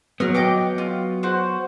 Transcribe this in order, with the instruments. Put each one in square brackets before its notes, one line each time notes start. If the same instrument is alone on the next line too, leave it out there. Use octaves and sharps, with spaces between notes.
[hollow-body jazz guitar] F#3 B3 [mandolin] A#4 C#5 F6
[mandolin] D#5 G5 D6
F4
F#4 C5